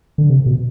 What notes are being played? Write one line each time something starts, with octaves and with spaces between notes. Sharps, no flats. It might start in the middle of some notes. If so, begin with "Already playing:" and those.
D3
C3
B2